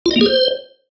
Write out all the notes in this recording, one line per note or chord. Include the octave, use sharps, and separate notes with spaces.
F4
D#5
A#3
G#4
C5